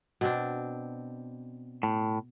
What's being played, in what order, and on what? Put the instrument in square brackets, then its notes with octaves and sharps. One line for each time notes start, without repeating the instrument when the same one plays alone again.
[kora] B2 C4 D4
[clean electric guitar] A2